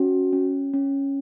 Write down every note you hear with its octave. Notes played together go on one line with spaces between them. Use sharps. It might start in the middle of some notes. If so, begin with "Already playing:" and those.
Already playing: C#4 F#4
C#4
C#4